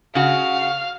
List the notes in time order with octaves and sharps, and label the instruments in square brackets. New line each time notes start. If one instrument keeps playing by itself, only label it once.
[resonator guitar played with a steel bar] C#3 F#4 [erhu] F5